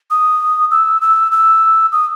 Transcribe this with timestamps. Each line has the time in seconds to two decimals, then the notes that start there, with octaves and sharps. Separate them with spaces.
0.11 D#6
0.71 E6
1.02 E6
1.32 E6
1.92 D#6